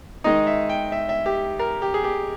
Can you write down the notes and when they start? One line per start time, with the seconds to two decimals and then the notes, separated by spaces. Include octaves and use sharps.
0.24 D#3 G#3 D#4 D#5
0.47 E5
0.69 G5
0.92 E5
1.09 E5
1.26 G4
1.59 A#4
1.82 G4
1.94 G#4
2.04 G4